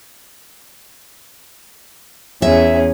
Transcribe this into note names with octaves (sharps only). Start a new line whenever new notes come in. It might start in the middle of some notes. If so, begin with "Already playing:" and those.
E2 C#4 G#4 E5